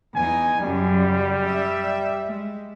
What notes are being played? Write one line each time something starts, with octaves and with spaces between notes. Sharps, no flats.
E2 D#4 G#5
F#2 C#3 G3
E5
G#3